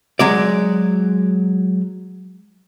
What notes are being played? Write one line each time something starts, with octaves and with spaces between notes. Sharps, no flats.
F#3 G#3 D5